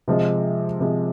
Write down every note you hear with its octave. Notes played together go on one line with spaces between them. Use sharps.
C3 F3 G#3
C3 F3 G#3